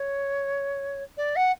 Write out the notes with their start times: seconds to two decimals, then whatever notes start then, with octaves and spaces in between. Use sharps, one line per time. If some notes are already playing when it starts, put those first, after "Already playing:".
Already playing: C#5
1.17 D5
1.36 F#5